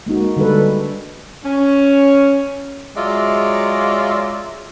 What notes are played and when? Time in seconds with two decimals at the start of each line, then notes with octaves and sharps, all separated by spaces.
0.06 G#3 A#3 D#4 F#4
0.36 D3 G3 G#3 A4 B4
1.45 C#4
2.97 F#3 G#3 F4 D5 E5